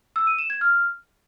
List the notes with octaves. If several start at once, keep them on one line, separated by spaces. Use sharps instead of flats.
E6
D#7
E7
G#6
F6